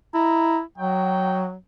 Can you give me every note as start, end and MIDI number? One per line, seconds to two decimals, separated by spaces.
0.14 0.62 64
0.14 0.57 75
0.14 0.57 82
0.78 1.55 54
0.78 1.46 63
0.78 1.46 66
0.78 1.46 79